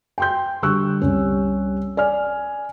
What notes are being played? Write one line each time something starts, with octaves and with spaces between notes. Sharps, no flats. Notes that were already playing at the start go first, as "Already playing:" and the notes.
G5 C6 G6
D3 G3 C#6 E6 F#6
C2 G3 C#4
D5 G#5 F6